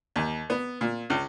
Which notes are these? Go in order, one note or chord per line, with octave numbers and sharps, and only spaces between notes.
D#2
B3
A#2
C#2